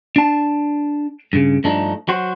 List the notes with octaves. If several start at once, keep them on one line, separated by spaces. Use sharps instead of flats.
D4 A5
G2 C#3
G2 F3 A3 D4 D#4
F#3 F#4 C5